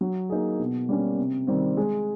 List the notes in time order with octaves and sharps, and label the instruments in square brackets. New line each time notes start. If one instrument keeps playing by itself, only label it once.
[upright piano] F#3
A#3 D#4 G#4
B2
G3 A#3 C#4
C3
D#3 G3 C4
G#3